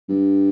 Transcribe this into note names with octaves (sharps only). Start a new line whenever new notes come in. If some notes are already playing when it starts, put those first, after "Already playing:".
G2